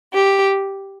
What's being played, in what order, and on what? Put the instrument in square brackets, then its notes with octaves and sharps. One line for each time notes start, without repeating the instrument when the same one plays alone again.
[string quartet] G4